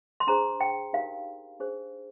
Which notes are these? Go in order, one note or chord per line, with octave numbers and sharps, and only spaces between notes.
C6
D4 G#4 C5 A#5
G5
D#4 G4 A#4 F5
D4 G#4 C5